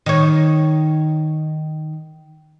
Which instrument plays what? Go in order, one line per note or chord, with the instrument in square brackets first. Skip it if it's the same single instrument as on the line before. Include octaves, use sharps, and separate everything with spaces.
[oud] D#3 C#5